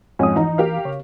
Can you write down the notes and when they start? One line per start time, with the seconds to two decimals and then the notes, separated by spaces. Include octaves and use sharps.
0.19 F2 G#2 C#4 G#5 D#6
0.36 E3 D#4 A#5
0.58 G4 A#4 F5
0.85 C#3 C#5